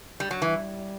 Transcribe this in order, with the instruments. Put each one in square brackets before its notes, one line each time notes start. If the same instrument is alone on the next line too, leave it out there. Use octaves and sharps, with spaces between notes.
[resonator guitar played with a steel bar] G3
F#3
[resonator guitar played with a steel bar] E3 [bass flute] G3